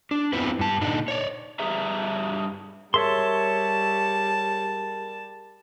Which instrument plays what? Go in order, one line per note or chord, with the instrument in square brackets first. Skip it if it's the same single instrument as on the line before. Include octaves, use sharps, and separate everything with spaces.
[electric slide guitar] D4
B3 C4 E4 F4 B4
G2 A5
A#2 D3 D4 D#4
C#5 D5
G2 G3 G#4 B4 E5 A#5
[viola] G3 A5 [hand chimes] G#4 A#4 [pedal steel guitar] C#5 E5 C6